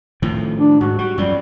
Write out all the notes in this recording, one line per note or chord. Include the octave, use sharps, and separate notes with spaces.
A2 D#3 F3
D4
G#2 F#4
G3 F#4
F#2 F3 G3